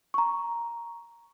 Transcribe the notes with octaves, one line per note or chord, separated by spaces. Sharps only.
A#5 C#6